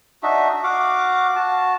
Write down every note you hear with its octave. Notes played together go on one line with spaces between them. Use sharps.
D4 D#4 F#4 E5
F#4 F5 F#5 D6
F#4 A5